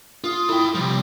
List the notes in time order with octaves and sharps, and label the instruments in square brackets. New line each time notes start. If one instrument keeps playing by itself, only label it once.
[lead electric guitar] F4 [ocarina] D#6
[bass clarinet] E4 [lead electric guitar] A4 G5
[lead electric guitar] C3 F3 [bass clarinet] G3